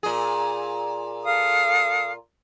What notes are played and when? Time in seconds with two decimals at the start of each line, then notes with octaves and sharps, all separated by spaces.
0.03 A#2 G#4
1.24 A4 F5 D#6